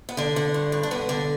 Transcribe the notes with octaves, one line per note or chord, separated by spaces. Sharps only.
B3
D3 D4
D3
G2
G2
D4
D3 B3
D3